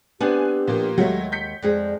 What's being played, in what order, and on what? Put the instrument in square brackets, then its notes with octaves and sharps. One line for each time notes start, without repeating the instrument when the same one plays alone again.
[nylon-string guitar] B3 C4 D4 [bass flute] G4 [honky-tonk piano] G#5 F#6
[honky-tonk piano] A#2 F3 A#3
[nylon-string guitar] D#2 G#3 F#5 [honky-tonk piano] F#3 A3
[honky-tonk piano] G6 B6 C#7
[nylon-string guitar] F2 G#3 G#4 [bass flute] D5